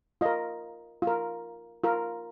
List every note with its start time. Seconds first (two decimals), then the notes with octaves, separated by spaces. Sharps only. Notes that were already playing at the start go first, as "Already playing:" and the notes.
0.21 F4 A#4 D#5
1.02 F4
1.07 A#4
1.84 F4 A#4